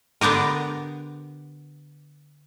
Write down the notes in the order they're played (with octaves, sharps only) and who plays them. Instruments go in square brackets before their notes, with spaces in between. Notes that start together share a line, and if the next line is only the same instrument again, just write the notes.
[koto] D3 B3 D4 G4 A#4